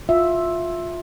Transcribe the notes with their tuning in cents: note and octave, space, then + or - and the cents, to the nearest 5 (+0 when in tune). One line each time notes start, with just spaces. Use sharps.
F4 +15 E5 +5